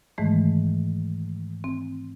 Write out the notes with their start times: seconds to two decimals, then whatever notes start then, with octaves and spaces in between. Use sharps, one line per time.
0.18 G#2 D#3 E3 G#3 A3
1.64 C4